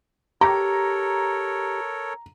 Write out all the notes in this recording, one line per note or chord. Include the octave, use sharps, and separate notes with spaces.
G4 A4 A#4 C#5 A#5